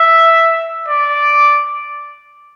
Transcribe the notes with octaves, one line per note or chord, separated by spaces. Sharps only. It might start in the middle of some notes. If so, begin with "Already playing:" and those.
Already playing: E5
D5